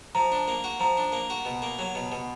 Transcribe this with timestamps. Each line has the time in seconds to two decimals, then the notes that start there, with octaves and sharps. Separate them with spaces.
0.15 F3 A#5
0.32 D4
0.48 A#3
0.64 F#4
0.80 F3 A#5
0.97 D4
1.12 A#3
1.30 F#4
1.45 B2
1.62 A#3
1.79 F#3
1.95 B2
2.12 B2